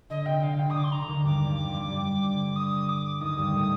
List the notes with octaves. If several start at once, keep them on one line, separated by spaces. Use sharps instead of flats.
D3 D#5
C3 G5
D3 F5
D3 G5
D#6
D3 D6
C6
D3 A#5
D#2 D#3
G2 G3 D6
G2 G3
F2 F3
G2 G3
D3
D#6
D6
D#2 D#3 D#6
G2 G3
A2 A3